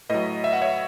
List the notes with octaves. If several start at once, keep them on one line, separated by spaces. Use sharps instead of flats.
A2 F#3 B4 D#5
E5
F#5
C#5 E5